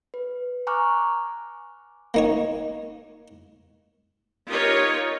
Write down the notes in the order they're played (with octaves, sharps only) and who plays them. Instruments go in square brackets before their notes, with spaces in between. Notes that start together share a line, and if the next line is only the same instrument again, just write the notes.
[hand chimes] B4
G#5 A#5 C#6 D6 F6 F#6
[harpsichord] A#3 D#4 C#5
[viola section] D#4 F4 G4 A#4 C#5 D#5